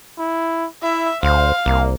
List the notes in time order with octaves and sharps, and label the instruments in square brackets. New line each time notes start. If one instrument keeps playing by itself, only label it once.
[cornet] E4
[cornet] E4 [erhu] E5
[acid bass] D2 [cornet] C5 [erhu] F5
[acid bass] C2 [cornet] A#3